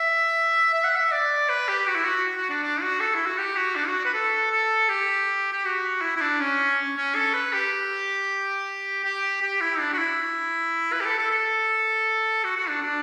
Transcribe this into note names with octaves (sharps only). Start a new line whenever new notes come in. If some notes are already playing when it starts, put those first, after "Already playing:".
Already playing: E5
E5
F#5
E5
D5
B4
G4
F#4
E4
F#4
F#4
D4
D4
F#4
A4
E4
F#4
G4
F#4
D4
F#4
B4
A4
A4
G4
G4
F#4
E4
E4
D4
C#4
C#4
A4
B4
G4
G4
G4
E4
D4
F#4
E4
B4
G4
A4
A4
A4
F#4
F#4
D4
D4